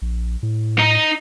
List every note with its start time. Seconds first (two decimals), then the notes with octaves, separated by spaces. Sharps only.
0.02 A#1
0.43 A2
0.79 D#4 D#5